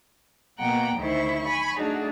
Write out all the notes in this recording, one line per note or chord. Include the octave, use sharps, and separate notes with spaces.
B2 A#3 F#5 G5 A#5
D2 D#3 E4 C5 C#6
G#5 B5 C#6
A3 D4 D#4 F#4 G#4